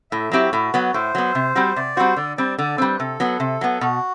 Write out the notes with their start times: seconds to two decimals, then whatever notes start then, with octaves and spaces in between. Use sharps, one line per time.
0.11 A2 E5
0.32 F#3 C4 E4 F#4 G4
0.53 A2
0.74 F#3 B3
0.94 A2 C5
1.15 F#3 B3
1.35 C3
1.55 G3 C4 F#4
1.76 C3 D5
1.96 G3 C4 F#4 C5
2.17 D3 D5
2.37 G3 C4 D5
2.59 D3 D5
2.78 G3 C4 B4
3.00 C3 A4
3.20 F#3 B3
3.40 C3
3.61 F#3 B3
3.81 B2 F#4